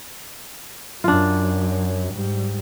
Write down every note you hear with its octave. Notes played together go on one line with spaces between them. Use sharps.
F#2 F#3 D4 F4
G#2 G3